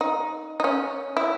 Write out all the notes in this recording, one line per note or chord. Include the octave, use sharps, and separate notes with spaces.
D#4
D#4
C#4
E4